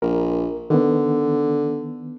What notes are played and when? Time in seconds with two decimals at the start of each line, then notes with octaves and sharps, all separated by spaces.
0.02 A#1 A#4
0.70 D3 D#3 B3